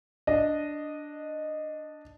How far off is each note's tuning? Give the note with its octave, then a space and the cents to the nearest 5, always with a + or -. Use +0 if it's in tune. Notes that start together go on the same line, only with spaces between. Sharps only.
D4 +0 D#5 -10